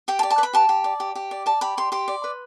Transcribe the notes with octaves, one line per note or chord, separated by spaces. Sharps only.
G4 G5
A5
D5
A5
B4
B5
G4 A5
G4
D5
G4
G4
D5
D5 A5
G4 B5
G4 C6
G4 C6
D5
B4